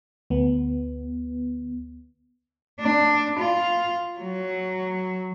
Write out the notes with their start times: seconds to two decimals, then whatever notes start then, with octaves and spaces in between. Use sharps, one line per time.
0.30 D2 B3
2.80 D4
3.39 F4
4.19 F#3